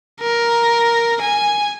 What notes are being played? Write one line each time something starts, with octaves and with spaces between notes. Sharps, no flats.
A#4
G#5